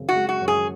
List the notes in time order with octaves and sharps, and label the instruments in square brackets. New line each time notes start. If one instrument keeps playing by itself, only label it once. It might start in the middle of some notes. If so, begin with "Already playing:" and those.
Already playing: [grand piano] F#2 C#3 C4
[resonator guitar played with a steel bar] F#4
[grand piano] G#3
[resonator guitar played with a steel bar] F#4
[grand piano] F#2
[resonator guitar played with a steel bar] G#4